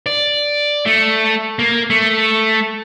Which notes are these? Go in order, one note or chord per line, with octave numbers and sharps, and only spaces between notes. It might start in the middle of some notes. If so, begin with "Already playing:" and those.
D5
A3
A#3
A3